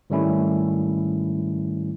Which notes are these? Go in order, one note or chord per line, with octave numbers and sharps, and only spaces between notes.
G#2 D#3 G3 A3 C#4 E4